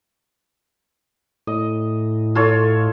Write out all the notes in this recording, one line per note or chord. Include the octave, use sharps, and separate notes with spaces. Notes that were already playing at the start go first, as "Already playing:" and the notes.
A2 D#5
F4 A4 C#5